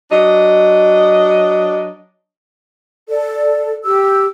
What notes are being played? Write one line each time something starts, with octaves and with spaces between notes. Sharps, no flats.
F#3 D4 D#5
A4 D5
G4 E6